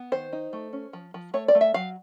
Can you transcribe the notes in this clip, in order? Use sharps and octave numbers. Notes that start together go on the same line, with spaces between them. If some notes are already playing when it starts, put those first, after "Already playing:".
Already playing: B3
D#3 C5
D#4
A3
C#4
F3
F3
A3 C#5
D5
A3
E5
F#3 F5